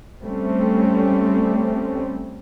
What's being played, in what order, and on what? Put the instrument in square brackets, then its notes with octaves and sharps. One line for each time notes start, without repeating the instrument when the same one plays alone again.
[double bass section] G3 A3 C4 C#4